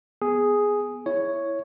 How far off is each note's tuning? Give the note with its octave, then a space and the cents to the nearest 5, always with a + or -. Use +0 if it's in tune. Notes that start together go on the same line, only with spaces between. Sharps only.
B3 +0 G#4 +0
E4 +0 C#5 +0